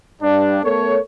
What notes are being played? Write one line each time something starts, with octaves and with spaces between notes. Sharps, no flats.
G2 D4
A3 B3 A4 A#4 C#5